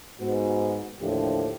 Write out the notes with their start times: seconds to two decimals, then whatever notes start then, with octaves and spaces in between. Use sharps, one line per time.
0.20 G#2 B3 F#4
1.00 D#2 A2 D3 F3 G4 A4